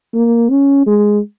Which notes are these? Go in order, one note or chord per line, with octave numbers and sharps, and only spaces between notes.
A#3
C#4
G#3